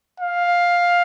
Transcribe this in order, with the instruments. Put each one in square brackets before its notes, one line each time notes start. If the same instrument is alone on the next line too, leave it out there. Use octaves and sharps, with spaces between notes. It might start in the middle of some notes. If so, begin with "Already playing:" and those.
[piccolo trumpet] F5